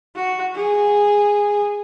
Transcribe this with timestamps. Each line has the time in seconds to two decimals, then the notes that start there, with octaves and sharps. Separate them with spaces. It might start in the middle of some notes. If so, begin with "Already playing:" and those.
0.16 F#4
0.55 G#4